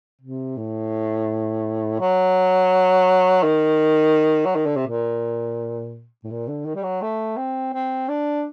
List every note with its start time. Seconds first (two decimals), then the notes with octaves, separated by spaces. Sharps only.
0.21 C3
0.57 A2
2.00 F#3
3.43 D#3
4.45 F#3
4.55 D#3
4.66 D3
4.76 C3
4.87 A#2
6.24 A2
6.30 A#2
6.48 D3
6.65 D#3
6.75 G3
6.83 F#3
7.02 A3
7.37 C4
7.74 C4
8.09 D4